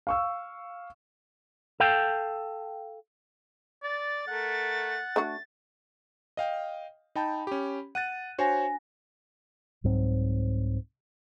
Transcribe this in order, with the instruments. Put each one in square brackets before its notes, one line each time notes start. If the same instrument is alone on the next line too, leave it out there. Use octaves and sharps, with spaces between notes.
[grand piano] F5 C#6 E6
[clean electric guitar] A4 F5 G5
[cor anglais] D5 [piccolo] A6
[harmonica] A3 A#4 [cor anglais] F#5
[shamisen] A3 D4 F#4
[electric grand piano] D#5 F5 G5
[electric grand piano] D#4 G5 A5 [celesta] B5
[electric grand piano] C#4 G4
[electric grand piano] F#5 F#6 A6 [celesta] D#7
[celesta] D4 G#5 A#6 [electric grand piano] F#4 C5 C#5
[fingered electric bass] C2 G#2 F#3 C4